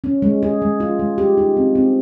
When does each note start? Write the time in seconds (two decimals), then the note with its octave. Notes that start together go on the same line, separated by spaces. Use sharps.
0.04 C#4
0.22 G#3
0.43 G#4
0.62 G#3
0.80 F4
0.99 G#3
1.18 G4
1.37 D#4
1.57 C4
1.75 C4